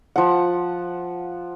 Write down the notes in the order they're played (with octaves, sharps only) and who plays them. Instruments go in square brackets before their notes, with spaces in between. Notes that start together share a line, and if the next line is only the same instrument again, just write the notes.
[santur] F3 F#5